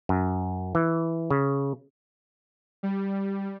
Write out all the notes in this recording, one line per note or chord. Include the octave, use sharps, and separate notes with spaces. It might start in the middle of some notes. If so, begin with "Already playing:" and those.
F#2
E3
C#3
G3